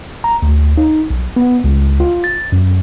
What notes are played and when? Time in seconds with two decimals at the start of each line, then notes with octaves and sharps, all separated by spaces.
0.24 A#5
0.43 D2
0.78 D#4
1.10 B1
1.36 B3
1.64 C#2
2.00 F4
2.24 A6
2.52 F#2